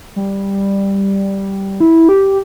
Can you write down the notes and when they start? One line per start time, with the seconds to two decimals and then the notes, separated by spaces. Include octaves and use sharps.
0.16 G3
1.80 E4
2.09 G4